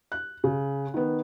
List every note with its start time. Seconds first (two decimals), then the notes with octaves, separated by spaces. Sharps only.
0.12 F#6
0.44 C#3
0.94 D#3 B3